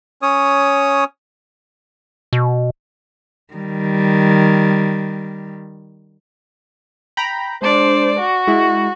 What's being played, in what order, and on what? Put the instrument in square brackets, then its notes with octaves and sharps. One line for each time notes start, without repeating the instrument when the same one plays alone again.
[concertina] C#4 C#5 D#6
[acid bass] B2
[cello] D#3 G3
[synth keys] G5 A#5 B5
[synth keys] G#3 D4 [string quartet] C5 D5
[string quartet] F#4
[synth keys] G#3 E4